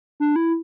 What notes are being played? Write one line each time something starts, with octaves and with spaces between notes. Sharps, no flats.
D4
E4